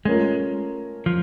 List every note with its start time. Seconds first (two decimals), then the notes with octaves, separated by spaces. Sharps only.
0.05 G#3 A3 C#4 F4 A#4
1.06 F3